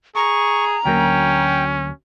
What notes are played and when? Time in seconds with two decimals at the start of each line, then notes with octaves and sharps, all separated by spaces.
0.16 G#4 A#5 C#6
0.85 D2 F#3 A#3 C#4 G5